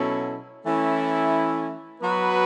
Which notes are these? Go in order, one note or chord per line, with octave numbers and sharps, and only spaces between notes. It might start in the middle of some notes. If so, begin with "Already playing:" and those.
Already playing: B2 F#3 C#4 E4 A4
E3 A3 C#4 E4
F#3 B3 F#4 B4